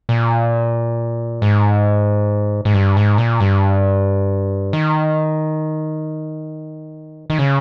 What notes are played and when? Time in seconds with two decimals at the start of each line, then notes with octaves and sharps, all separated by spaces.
0.09 A#2
1.42 G#2
2.65 G#2
2.74 G2
2.97 G#2
3.18 A#2
3.40 G2
4.73 D#3
7.30 D#3
7.39 C#3